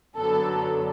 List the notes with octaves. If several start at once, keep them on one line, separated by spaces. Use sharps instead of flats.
F#2 D3 F#3 B3 D4 A4